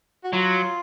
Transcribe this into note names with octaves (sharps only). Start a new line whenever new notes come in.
F#4
F#3 F4